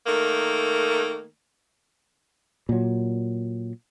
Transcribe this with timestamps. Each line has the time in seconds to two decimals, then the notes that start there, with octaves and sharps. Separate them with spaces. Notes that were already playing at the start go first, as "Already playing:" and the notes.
0.07 D#3 A3 A#3
2.69 A#2 F#3